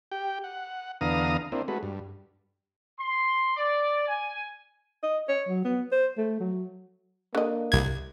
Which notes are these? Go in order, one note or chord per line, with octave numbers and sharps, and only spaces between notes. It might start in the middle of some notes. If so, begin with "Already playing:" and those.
G4 G5
F#5
E2 D3 B3 F5 A#5 D#6
A#3 C4 D4 E4
G#3 A3 F#4 B4
G2
C6
D5
G#5
D#5
C#5
F#3
B3
C5
A3
F#3
D3 A#3 D#5
C2 G#6